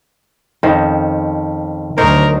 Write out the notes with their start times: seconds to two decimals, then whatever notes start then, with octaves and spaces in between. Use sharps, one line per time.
0.63 F2 D#3 C#4 C5
1.98 D2 F#3 D#4 A#4 C5 C#5